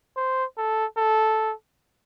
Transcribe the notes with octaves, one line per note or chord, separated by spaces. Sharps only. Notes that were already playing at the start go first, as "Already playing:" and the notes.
C5
A4
A4